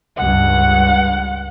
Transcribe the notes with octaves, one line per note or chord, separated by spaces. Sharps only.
C#2 G2 F#5